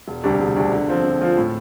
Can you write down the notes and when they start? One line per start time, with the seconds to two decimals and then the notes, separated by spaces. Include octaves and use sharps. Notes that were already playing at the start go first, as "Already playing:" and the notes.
0.08 E1
0.24 D2 C3 G3 D4
0.40 E1
0.56 D2 C3 G3 D4
0.72 D3
0.88 F3 C4 F4
1.04 D3
1.21 F3 C4 F4
1.37 A2